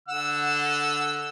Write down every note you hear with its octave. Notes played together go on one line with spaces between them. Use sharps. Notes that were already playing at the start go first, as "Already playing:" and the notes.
D3 F#5 E6